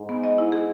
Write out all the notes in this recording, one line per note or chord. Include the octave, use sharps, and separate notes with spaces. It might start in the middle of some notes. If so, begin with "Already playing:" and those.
Already playing: G#2
B3
D#5
E4
G#4